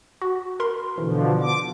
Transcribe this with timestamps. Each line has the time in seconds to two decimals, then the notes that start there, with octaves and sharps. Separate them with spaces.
0.22 F#4
0.60 A#4 B5 C6
0.98 B2 D3 E3 F3
1.41 D6